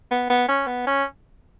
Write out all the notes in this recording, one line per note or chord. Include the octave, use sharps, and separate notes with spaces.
B3
B3
C#4
B3
C#4